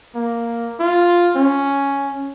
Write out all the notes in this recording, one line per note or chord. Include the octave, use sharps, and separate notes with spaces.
A#3
F4
C#4